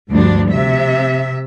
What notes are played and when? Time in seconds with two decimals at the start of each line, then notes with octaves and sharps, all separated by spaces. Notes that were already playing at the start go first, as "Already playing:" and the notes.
0.11 D2 G2 F3 G3 D4
0.49 C3 E5